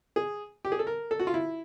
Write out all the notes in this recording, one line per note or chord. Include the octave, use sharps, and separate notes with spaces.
G#4
G4
G#4
A4
A#4
A4
F#4
F4
E4